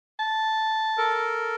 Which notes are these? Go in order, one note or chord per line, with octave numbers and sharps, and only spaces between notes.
A5
A4 A#4